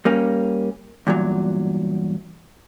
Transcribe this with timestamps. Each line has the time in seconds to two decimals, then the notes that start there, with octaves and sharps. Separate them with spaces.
0.05 G3 A#3 C#4
1.07 E2 G2 A#2 F#3